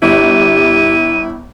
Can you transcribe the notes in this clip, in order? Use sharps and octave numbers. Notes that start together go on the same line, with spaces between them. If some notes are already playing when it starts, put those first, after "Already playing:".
G1 E4 G4 D#7